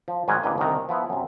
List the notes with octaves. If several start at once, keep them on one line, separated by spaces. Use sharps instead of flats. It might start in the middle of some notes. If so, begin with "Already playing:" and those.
F3
G#2 D#3 G3 F#4 G4 G#5
A1 E2 D3 A#3 B4 D#5
C2 D3 D#3 A#5
F3 B3 E4
F#2 C3